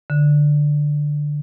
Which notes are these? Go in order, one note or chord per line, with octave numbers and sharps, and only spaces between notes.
D3